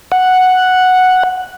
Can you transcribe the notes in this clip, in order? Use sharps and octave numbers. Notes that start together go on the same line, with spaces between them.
F#5